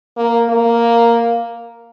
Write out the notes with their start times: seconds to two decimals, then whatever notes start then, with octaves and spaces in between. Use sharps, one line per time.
0.16 A#3
0.48 A#3